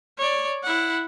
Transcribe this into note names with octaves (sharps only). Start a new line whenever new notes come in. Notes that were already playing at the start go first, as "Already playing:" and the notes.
C#5 D5
E4 F#5